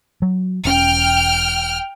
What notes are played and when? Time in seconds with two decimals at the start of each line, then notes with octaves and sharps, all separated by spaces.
0.22 F#3
0.65 E1 C#4 G5 F6